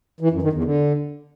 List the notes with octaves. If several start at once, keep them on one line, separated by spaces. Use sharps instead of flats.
E3
F#2
D#3
E2
D3